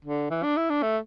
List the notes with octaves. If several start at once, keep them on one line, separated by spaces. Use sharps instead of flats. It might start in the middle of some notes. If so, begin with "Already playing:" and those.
D3
E3
D4
E4
D4
A3